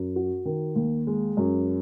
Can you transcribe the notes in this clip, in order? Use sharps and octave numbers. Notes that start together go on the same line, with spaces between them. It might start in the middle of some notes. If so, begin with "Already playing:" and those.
Already playing: F#2
F#4
D#3
D#2
G#3
F#2